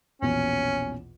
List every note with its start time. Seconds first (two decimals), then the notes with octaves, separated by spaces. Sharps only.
0.22 A#1 E2 B2 C#4